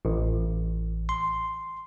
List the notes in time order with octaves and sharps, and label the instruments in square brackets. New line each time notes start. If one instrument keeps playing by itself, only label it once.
[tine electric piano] A1
C6